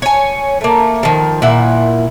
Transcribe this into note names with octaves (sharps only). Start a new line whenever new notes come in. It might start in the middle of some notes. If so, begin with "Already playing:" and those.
C#5 G#5
A3 A#3
D#3 F3
A#2 E4 F#5